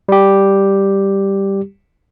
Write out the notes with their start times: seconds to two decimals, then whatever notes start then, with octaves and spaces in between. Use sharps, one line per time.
0.09 G3 G4